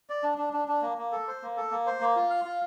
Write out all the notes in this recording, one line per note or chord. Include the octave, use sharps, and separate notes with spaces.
D5
D4
D4
D4
D4
A#3
A#3
A4
C5
A#3
A4
A#3
C5
A#3
F4
F5
F4